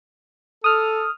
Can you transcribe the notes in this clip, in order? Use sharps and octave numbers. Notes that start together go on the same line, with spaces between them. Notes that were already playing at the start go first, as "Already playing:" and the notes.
A4 D#6 F6